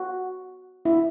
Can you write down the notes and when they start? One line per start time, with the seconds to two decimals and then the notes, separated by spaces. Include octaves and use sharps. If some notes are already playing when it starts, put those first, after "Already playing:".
Already playing: F#4
0.85 E4